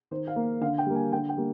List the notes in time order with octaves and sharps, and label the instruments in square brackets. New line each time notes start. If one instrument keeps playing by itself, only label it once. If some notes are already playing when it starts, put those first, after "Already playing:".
[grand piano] D#3 C5
F5
A#3
D3 F5
G5
G3 A#3
G#5
D3 G5
G5
G3 A#3